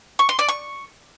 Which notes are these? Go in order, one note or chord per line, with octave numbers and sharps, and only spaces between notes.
C#6
C6
D5
C#6